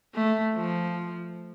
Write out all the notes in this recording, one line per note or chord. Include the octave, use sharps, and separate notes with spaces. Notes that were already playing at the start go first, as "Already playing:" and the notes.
A3
F3